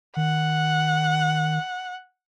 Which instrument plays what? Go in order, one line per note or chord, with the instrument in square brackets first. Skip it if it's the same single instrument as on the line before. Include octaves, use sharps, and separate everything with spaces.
[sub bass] D#3 [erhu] F#5